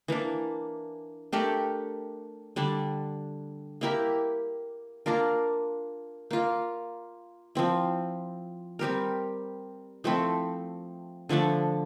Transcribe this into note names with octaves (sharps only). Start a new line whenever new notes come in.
E3 A#3 D4
A3 D4 G4 A#4
D3 G3 D4
A#3 E4 G4 A#4
A#3 D4 F4 A#4
A#3 F4 A#4
F3 C4 E4
G3 C4 G4 A#4
F3 A3 C4 E4
D3 F3 A3 D4